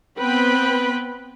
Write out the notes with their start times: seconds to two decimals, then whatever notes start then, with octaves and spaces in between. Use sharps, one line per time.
0.19 B3 C4 B4 G5 B5